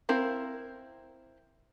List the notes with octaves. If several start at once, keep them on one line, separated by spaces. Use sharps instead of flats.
C4 E4 A#4 F5